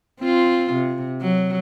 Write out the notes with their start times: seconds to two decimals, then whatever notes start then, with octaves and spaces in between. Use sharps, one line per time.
0.20 C4 F4
0.73 C3
1.21 F#3